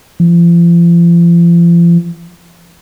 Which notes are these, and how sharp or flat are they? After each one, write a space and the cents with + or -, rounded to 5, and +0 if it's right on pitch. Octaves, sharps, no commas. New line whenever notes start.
F3 -40